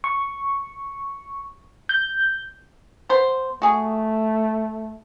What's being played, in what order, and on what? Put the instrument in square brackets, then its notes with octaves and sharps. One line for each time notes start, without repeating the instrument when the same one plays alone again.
[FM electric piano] C#6
G6
[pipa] B3 C5
[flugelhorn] A3 [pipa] F#4 G#4